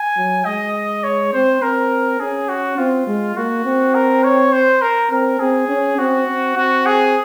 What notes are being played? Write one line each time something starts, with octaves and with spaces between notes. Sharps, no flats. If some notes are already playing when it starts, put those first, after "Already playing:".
Already playing: G#5
F#3
G#3 D#5
C#5
C4 C5
C4 A#4
C#4 G#4
F#4
C4 F4
G#3
A#3 F#4
C4
A#4
C#5
C5
A#4
C4 A#4
C4 G#4
C#4
C4 F#4
C4
C4 F#4
G#4